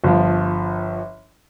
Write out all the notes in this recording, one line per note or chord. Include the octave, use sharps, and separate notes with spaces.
G1 F3